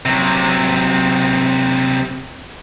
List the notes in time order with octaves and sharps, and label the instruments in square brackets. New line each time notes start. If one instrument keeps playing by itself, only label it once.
[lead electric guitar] C3 F#3